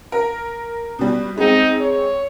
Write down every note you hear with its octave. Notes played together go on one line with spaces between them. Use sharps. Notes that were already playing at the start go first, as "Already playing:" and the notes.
A#4
B2 G3
G#3 C4 D#4
C#5